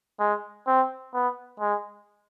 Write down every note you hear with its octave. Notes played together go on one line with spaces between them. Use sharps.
G#3
C4
B3
G#3